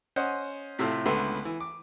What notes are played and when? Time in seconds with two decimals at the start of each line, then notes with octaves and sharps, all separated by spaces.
0.16 C#4 C5 D#5 F#5
0.79 A2 C3 A3 E4 F4
1.05 C#2 D3 A3 B3 B4 C6
1.45 E3
1.60 D6